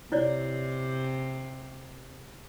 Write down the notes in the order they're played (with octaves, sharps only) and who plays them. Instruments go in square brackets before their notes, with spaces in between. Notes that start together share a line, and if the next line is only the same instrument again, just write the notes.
[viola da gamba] C3 [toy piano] E4 C#5 D5